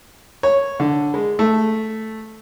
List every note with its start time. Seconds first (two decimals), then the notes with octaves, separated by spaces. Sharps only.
0.43 C#5
0.80 D3
1.14 G#3
1.39 A3